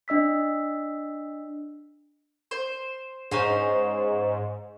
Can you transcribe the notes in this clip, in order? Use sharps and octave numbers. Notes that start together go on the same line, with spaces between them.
D4 D#5 E6 B6
C5
G#2 C#4 D#4 C5